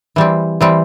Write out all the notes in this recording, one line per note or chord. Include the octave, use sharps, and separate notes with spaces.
E3 G3 C4
E3 G3 C4